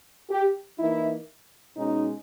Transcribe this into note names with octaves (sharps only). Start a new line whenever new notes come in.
G4
E3 A#3 D#4 E4
B2 G#3 C#4 D#4